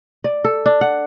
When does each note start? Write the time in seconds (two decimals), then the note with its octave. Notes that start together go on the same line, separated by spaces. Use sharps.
0.24 D5
0.44 A4
0.66 D4
0.81 F#5